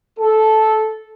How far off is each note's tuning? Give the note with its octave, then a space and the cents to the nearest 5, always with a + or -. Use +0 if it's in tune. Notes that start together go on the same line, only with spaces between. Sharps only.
A4 -10